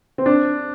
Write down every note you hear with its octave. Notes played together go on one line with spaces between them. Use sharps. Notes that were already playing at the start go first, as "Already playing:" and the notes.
C4
D4